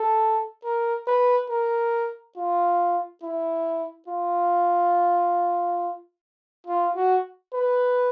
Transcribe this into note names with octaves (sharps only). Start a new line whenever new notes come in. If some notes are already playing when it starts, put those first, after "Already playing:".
Already playing: A4
A#4
B4
A#4
F4
E4
F4
F4
F#4
B4